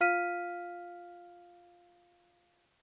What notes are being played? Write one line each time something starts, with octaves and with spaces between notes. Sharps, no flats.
F4 F5 F6 B6 D#7